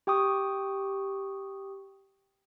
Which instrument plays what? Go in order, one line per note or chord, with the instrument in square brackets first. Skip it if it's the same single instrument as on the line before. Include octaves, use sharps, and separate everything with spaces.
[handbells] G4 G5 C#6 D#6